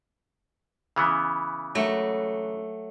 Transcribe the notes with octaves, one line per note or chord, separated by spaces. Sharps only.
C#3 E3 B3
F#3 A3